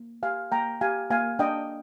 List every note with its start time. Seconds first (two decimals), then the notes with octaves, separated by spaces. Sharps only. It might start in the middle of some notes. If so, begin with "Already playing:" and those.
Already playing: A#3
0.23 G4 F5 G#5
0.52 A#3 G5 A#5
0.81 G4 F5 G#5
1.10 A#3 F5 G#5
1.39 D4 D#5 G5